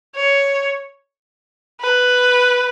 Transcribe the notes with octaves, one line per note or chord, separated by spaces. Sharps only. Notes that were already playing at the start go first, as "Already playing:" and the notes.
C#5
B4